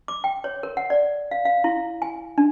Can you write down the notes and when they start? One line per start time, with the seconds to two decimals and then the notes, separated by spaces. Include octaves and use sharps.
0.08 D6
0.24 G5
0.44 C#5
0.63 A#4
0.77 F#5
0.90 D5
1.31 F5
1.45 F5
1.64 E4
2.02 G#5
2.38 D4